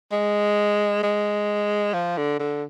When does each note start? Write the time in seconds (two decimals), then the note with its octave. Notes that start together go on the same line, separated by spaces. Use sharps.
0.12 G#3
1.03 G#3
1.94 F3
2.18 D3
2.40 D3